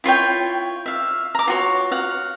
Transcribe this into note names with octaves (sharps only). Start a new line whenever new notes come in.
E4 F4 C#5 G5
E5 F5
A#5 D6
F4 F#4 C#5
F5 F#5